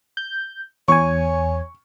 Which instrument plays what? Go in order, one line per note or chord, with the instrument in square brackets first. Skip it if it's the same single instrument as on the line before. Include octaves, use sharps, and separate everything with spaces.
[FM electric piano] G6
[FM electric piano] E2 G#5 [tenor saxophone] C#5 [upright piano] C#6